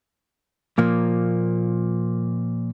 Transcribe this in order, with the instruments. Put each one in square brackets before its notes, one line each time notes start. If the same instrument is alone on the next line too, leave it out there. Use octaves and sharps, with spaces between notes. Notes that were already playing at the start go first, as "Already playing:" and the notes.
[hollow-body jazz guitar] A#2 F3 A#3